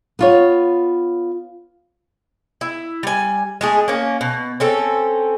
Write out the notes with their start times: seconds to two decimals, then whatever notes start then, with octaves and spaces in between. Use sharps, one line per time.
0.19 B3 F4 C#5
2.61 E4
3.03 G3 G#5
3.61 G#3 A3 G#4
3.88 A#3 C#4
4.21 B2
4.60 C4 C#4 A4